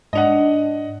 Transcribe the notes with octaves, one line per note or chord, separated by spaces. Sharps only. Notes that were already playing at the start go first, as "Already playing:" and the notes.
G#2 D4 D#5 F#5